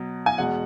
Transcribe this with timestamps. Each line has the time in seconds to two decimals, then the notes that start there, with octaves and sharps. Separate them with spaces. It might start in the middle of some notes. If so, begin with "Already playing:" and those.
Already playing: B2 F#3
0.26 G#5
0.38 E2 B2 G#3 F#5